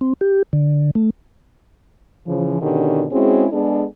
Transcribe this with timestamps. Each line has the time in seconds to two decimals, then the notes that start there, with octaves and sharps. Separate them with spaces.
0.01 C4
0.21 G4
0.53 D3
0.95 A3
2.26 C#3 E3 F3
2.61 B2 D3 D#3 C#4 D4 G4
3.12 G#3 C4 C#4 E4 F#4 G#4
3.52 G#3 B3 D4 G#4 A4